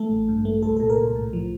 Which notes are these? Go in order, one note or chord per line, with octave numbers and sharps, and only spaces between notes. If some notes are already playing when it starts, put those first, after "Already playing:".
Already playing: A3 A4
A1
G2
A3
C2 A4
A#2 A4
A#4
C2
A2
F3